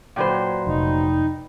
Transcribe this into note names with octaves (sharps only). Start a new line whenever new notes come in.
A#2 F#3 B4 C5 D5 G5
F1 D#4